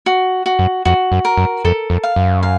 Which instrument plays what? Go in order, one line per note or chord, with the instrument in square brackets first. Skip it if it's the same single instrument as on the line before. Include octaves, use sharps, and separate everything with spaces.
[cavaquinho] F#4
F#4
[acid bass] F#2
[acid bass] F2 [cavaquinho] F#4
[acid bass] F#2
[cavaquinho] A#4
[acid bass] F#2
[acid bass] F2 [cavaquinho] A4
[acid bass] F2
[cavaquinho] F5
[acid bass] F#2
[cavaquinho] F5